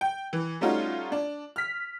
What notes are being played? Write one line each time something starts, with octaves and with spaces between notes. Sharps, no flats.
G5
E3
G3 A3 C#4 D#4 F4 F#4
D4
F6 B6